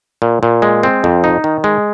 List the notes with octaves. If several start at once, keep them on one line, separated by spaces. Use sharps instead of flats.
A#2
A#2
G#3
C4
F2
D#4
D#3
G#3